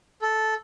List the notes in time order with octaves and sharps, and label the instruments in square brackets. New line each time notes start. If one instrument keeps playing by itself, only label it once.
[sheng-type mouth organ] A4